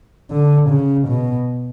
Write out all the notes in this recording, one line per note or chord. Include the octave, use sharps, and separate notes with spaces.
D3
C#3
B2